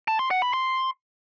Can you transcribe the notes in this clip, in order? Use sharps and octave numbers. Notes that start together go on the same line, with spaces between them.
A5
C6
F#5
B5
C6